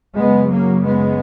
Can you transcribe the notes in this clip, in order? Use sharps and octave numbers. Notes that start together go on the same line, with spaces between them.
F#2 C#3 G#3 B3
F#3 A#3
G#3 B3